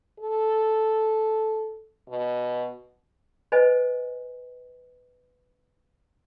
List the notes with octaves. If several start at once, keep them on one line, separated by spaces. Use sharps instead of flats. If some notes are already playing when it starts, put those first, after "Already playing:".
A4
B2
B4 C5 D#5 G#5